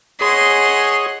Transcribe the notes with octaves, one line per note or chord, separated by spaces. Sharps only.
G#4 C#5 D#5 F#5 C6